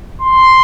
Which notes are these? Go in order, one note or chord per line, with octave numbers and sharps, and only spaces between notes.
C6